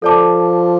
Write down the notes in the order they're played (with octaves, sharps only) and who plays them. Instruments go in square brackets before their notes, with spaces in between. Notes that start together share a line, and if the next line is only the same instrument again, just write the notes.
[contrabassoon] F3 [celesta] A4 D5 A5 D6